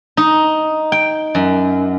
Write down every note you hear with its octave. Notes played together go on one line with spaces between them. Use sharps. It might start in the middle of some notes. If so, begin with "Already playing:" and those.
D#4
G5
F#2